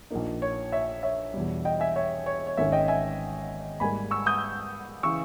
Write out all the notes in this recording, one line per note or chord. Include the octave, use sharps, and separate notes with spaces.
A#1 A#2 A#3 D#4
C#5
C#5 E5
C#5 E5
E2 B2 G3
D#5 G5
E5 G#5
C#5 E5
C#5
C#5
G#1 G#2 D#3 A#3 C#4 C#5 E5
D#5 G5
E5 G#5
G#2 G3 A#3 G#5 B5
C#6 E6
D#6 G6
C#3 E3 C#6 E6